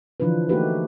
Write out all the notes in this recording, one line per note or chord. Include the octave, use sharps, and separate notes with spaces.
D3 E3 F3 D4 F4 B4
A3 A#3 D#4 F#4 G4 B4